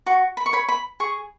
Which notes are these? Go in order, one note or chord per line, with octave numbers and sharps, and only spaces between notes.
F#4 C#6
B5
C#6
C#5 B5
B5
G#4 C#6